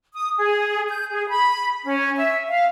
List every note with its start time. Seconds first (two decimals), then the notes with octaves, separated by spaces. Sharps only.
0.14 D#6
0.37 G#4
0.89 G6
1.10 G#4
1.28 B5
1.85 C#4
2.16 E5
2.48 F5